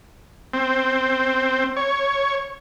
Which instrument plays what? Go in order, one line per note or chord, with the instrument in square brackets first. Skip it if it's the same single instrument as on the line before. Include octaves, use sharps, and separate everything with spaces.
[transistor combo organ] C4
C#5